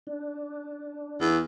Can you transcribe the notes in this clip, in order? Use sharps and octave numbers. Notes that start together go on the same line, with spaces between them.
D4
E2